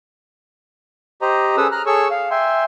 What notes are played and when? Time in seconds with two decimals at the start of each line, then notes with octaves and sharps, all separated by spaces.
1.22 G4 C5 D#5 A#5
1.57 C#4 G#4 A4 B4 D#6 E6
1.72 A#5 F6 F#6
1.86 G#4 A4 C#5 C#6 E6
2.11 F5
2.31 E5 G5 G#5 C6